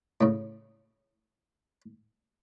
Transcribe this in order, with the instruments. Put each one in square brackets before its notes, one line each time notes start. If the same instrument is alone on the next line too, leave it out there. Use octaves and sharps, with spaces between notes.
[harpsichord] A2 C#3